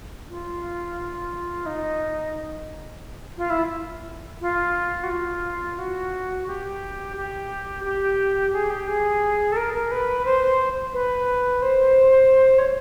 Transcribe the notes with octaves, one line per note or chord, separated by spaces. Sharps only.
F4
D#4
F4
E4
F4
F#4
F4
F#4
G4
G4
G4
G#4
G4
G#4
A4
A#4
A#4
B4
C5
B4
C5
C#5